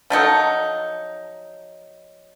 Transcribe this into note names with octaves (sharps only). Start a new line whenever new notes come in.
F3 F#3 D#4 A4